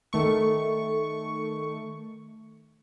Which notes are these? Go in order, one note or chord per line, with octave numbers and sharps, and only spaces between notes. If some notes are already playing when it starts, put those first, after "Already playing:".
D#3 A3 C#6